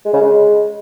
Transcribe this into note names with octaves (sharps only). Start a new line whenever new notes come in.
G#3
C#3
G#3